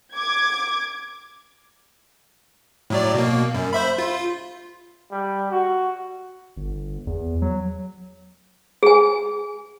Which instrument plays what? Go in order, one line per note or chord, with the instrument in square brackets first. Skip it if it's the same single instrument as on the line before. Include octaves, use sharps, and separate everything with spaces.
[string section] D6 G#6
[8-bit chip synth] A2 F#3 D5
B2 A#3
F#2
C5 E5 B5
F4
[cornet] G3
F#4
[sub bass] G1
E2
F#3
[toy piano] G#4 G#5